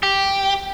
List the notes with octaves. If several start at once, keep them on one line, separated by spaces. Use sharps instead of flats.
G4